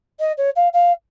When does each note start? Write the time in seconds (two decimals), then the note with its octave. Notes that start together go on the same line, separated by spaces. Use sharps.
0.20 D#5
0.38 C#5
0.56 F5
0.73 F5